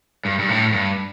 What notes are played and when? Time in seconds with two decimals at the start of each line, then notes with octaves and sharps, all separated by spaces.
0.25 G2
0.39 G2
0.49 A2
0.73 G2